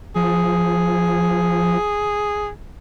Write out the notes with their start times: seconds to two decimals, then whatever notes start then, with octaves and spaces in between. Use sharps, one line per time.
0.16 F3 G#4